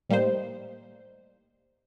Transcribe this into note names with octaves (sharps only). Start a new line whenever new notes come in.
A2 G3 A#3 D#4 C5